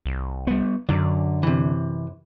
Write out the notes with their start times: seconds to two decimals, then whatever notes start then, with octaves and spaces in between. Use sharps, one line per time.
0.06 C2
0.47 G3 B3
0.89 F#2 D3 F#3 D5
1.43 C3 E3